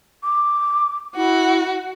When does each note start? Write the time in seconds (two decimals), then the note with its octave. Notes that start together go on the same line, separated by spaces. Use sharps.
0.23 D6
1.16 E4 F#4